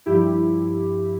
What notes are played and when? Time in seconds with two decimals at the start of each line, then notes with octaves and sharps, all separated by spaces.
0.06 G2 F3 E4 G4